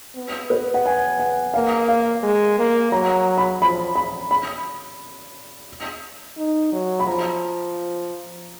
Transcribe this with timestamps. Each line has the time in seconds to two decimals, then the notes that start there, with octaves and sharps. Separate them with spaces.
0.16 B3
0.50 B4
0.74 F#5
0.86 G#5
1.20 F#5
1.54 A#3 F5
1.89 F5
2.23 G#3
2.58 A#3
2.92 F#3 A#5
3.38 B5
3.61 F3 B5
3.95 B5
4.31 B5
6.37 D#4
6.72 F#3
7.00 B5
7.07 F3 A#5